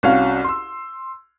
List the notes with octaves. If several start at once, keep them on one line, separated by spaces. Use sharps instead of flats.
C2 C#4 F#4 F5
C6 E6